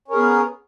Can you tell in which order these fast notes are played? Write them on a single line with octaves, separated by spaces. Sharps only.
C#4 A#4 G#4 B3